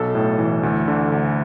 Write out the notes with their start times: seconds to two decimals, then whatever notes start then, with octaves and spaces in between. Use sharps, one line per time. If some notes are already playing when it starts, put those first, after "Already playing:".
Already playing: B1 A4
0.15 A2
0.39 E3
0.63 D2
0.88 D3
1.12 D2